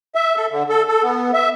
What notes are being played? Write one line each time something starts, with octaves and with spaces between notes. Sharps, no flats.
E5
A4
D3
A4
A4
B3
E5